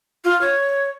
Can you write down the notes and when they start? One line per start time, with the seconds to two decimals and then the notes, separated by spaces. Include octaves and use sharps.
0.25 F4
0.41 C#5